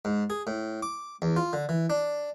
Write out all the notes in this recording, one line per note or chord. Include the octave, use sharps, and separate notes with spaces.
G#2
G#4
A2
D6
E2
F4
D3
E3
D4